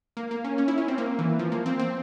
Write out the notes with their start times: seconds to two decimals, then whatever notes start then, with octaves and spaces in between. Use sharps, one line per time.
0.17 A#3
0.31 A#3
0.44 C#4
0.58 C#4
0.68 E4
0.78 C#4
0.88 C4
0.98 A#3
1.19 E3
1.39 F3
1.52 A#3
1.66 C4
1.79 C4